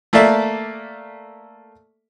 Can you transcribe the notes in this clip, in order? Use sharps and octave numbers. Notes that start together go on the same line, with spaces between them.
A3 A#3 A4 D5 E5